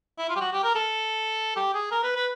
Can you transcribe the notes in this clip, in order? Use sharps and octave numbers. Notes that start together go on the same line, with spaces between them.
E4
F4
G4
F#4
G4
A#4
A4
G4
G#4
A#4
B4
B4